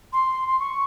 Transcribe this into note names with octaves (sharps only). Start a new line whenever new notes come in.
C6
C6
C#6